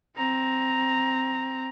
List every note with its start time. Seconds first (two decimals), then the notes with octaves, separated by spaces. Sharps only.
0.16 C4 A#5